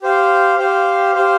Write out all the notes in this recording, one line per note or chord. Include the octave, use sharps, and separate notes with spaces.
G4 C5 F5
G4 C5 F5
G4 C5 F5